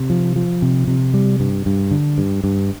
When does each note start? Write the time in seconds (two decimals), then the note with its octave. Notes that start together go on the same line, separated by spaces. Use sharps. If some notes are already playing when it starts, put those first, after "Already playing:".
Already playing: C3
0.10 F3
0.36 F3
0.62 C3
0.88 C3
1.14 G3
1.40 G2
1.66 G2
1.91 D3
2.18 G2
2.44 G2